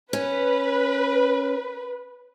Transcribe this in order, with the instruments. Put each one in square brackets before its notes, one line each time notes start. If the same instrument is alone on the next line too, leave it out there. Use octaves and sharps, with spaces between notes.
[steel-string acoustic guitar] C#4 [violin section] B4